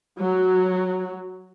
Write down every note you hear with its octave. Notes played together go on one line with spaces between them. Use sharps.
F#3